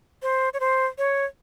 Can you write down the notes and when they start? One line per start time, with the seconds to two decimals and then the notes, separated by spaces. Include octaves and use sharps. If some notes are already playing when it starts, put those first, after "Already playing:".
0.22 C5
0.54 C#5
0.60 C5
0.98 C#5